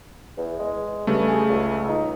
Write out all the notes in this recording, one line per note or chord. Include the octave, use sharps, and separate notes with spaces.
E2
G#3
G2 C#3 G3 A3
G#4
C#2
D#4